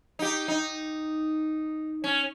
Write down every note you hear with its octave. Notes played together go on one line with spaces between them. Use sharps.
D#4 G4
D#4
C#4